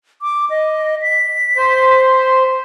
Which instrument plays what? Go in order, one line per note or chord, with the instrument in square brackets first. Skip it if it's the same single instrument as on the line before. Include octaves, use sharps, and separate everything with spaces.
[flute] D6
D#5
B6
[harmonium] C5